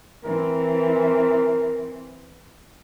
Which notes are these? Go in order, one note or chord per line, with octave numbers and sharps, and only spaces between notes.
E3 C4 A#4